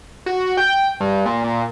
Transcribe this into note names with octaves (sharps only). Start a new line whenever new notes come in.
F#4
G5
G2
A#2
A#2